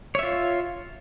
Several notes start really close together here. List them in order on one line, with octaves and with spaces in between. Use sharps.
C#5 E5 F4